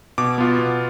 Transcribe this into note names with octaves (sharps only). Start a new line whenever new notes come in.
B2 D6
B3 F4
B2